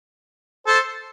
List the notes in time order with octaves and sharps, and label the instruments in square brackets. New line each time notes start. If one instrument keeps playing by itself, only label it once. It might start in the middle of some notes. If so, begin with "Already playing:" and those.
[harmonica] A4 C5